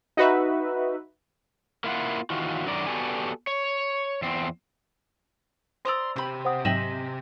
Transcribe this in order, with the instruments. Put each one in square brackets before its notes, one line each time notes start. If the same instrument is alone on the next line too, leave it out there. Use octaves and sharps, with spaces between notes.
[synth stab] D#4 F#4 B4 E5
[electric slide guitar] A#3 E4 F4 F#5
D#3 E3 F4 F#4
F#2 D3 D#3 F#4 A#4 D5
B3 F#4 G4 A4 D5 G#5
C#5
E2 C4
[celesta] C5 E6 [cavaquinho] D5 A#5 D#6 [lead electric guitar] C6
[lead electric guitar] C3 G4 [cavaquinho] B5 C6
[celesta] C5 F#5 D#6
[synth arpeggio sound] G#2 F#3 C4 [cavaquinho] D#5 E5 G#5 [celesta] E7 F#7